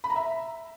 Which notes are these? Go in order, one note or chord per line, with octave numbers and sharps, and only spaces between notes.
B5
A#5
E5